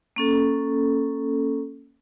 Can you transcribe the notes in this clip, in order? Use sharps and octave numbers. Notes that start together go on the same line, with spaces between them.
A#3 C#4 A4